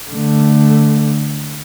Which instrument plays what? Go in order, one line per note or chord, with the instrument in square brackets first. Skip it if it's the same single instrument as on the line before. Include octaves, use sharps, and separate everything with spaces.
[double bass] D3 A3